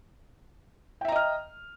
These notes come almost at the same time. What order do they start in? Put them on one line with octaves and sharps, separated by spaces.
G5 E5 A#5 D#5 F6